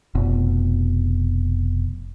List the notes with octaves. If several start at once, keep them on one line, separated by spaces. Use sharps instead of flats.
F1 B2